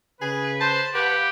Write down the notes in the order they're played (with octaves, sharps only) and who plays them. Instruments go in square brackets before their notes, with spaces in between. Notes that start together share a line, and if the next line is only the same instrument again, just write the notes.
[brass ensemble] C#3 B4 [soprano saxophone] G#4
[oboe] C5 [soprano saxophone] A5
[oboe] G4 [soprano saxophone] B4 [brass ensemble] F5 F#5